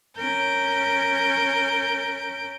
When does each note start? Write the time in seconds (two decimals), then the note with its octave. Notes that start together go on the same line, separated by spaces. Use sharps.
0.18 C#4 A#4 G6 D7